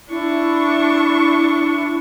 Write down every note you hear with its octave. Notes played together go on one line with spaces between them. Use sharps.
D4 E4 C#6